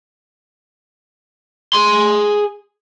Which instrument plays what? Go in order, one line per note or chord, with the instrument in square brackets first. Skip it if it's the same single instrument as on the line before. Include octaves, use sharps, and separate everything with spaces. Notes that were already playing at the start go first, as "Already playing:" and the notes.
[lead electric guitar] G#4 C6